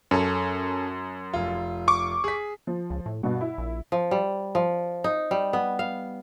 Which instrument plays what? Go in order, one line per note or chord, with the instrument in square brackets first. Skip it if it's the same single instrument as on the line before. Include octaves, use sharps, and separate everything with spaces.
[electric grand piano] F#2 [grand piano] C#4 A4
[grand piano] F1 F4
[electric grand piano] C#6 D6
[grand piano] G#4 B6
[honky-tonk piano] F3
[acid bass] C#2
A2
[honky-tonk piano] G2 B2 [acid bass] F#4
[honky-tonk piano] E4
[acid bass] A#1
[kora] F3
G3
F3
D#4
G3
B3
F5